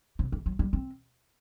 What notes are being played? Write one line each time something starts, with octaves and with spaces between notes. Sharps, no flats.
C3
E3
F#3
G3
C4